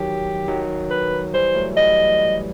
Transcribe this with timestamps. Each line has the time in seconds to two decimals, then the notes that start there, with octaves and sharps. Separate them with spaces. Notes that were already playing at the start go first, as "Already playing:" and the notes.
Already playing: D#3 F#3 G4
0.48 D#3 F#3
0.90 B4
1.34 E3 G3 C5
1.55 F#3 A3
1.76 E3 G3 D#5